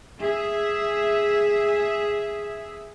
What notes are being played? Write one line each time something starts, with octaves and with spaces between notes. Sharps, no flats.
G#4 E5